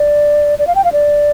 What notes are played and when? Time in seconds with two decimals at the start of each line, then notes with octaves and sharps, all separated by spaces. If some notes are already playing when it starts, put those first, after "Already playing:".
Already playing: D5
0.59 D5
0.67 F5
0.75 G5
0.84 F5
0.92 D5